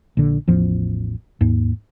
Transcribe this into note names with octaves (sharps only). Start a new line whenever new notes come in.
A#1 D3
A1 E2 F3
D#2 G#2